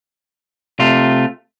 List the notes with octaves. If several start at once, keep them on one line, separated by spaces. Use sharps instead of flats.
C3 A3 F4